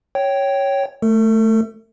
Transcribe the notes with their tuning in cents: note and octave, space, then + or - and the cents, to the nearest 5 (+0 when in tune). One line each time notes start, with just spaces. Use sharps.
C#5 +0 G5 -10
A3 +0 A4 +45